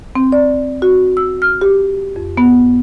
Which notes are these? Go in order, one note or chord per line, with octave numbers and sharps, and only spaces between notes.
C4
D5
F#4
E6
F6
G4
F2
B3